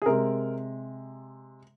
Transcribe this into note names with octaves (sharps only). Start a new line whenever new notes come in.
G#4
C3 G#3 A#4